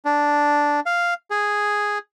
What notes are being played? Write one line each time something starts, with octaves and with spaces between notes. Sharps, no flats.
D4
F5
G#4